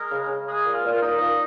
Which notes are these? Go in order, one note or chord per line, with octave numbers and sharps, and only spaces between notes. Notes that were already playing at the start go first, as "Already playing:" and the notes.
Already playing: G#3 A#4
C#3
C#3
G#3 G#4
A#2
F4
A#2
F4
A#2 D#4
A#2